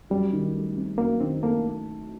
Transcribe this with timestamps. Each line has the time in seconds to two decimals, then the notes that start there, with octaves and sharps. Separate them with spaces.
0.10 F#2 G3
0.33 D#3
0.54 A3
0.77 C4
0.98 F#2 A#3
1.20 D#3 C4
1.42 A3 A#3